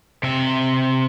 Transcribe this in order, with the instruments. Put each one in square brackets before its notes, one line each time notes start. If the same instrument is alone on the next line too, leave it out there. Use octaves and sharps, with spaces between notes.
[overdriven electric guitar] C3 E5